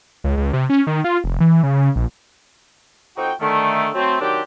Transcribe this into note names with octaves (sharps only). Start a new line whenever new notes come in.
C#2
C#2
C3
C#4
D#3
F4
F1
E3
C#3
A#1
F2 C4 D#4 F#4 G5
D3 D#3 A3
F#3 A3 C4
D#3 F#3 C4 D4 G4